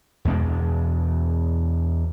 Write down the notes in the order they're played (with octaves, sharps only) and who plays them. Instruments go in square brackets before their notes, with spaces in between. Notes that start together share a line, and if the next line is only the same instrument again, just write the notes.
[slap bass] E2 B2 G#3 D4